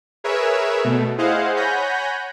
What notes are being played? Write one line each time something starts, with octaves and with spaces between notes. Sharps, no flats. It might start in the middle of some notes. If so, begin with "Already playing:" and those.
G#4 A#4 B4 C#5 E5
B2 A3
E4 G#4 C5 D#5 F5 F#5
C#5 F#5 G#5 B5 G6 A#6